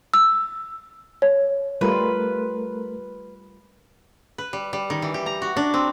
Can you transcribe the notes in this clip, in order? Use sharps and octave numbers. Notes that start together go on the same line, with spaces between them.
E6
C#5
G3 A3 F4 A#4 B4
B4
G3
G3
D#3
E3
G4
A#5
F#4
D4
C4